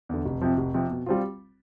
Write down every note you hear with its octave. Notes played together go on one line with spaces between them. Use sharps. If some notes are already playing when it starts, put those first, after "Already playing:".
E2 D3
F1
F2 C3 F3
F1
F2 C3 F3
B2
G3 C4 F4